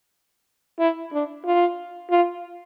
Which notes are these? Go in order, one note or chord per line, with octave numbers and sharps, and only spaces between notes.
E4
D4
F4
F4